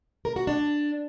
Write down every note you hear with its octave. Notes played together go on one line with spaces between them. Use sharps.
A#4
F#4
D4